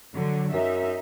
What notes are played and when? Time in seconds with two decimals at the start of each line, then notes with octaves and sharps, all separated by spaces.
0.14 D3 F#3
0.54 F#2 D#4 E5